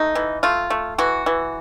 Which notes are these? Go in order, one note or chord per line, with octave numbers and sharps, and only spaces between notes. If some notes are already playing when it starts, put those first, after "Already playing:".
Already playing: A3 D#4
E3
A3 F4
A3
E3 F#4
E3